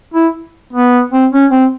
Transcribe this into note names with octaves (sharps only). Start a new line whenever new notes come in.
E4
B3
C4
C#4
C4